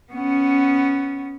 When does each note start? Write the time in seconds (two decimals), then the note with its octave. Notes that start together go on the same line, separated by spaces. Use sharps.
0.13 B3 C#4